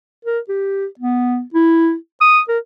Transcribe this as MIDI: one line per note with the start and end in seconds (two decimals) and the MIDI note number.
0.25 0.39 70
0.49 0.86 67
0.99 1.42 59
1.54 1.95 64
2.21 2.40 87
2.48 2.58 70